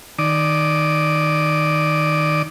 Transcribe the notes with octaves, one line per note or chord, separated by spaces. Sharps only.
D#3 D5 D6 D#6